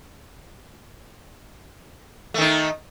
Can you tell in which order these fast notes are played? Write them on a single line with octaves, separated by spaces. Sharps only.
A3 D#3 D#4